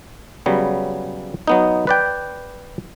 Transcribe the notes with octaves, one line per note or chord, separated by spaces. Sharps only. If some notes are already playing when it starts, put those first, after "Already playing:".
C#3 F#3 G3 B3
F#3 B3 D#4
B4 D5 G5